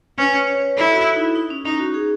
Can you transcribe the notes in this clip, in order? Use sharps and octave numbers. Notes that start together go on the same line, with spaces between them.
C#4 B4
C#5
C#5
B4
E4 A4
F#4
E4
D#4
E4
D#4
C#4
C#4 D#4
F#4
G#4